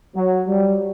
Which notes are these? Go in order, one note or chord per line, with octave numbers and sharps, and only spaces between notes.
F#3
G3